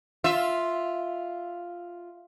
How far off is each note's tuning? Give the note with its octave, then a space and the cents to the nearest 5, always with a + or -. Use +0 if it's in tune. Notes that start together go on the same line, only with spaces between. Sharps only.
F4 +0 E5 +0